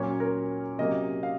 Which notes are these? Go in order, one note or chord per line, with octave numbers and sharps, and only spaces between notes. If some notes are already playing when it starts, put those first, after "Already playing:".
Already playing: A#2 F#3 A#3 C#4 C#5
A#4
C3 F#3 A#3 C#4 D#5
F5